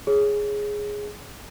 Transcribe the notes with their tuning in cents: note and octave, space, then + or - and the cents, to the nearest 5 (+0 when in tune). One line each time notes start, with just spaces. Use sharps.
G#4 +0 C#5 +0